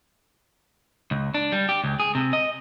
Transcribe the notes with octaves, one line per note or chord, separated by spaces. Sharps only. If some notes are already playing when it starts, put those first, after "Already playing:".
C#2
D4
G3
G4
C#2
G#4
C3
D#5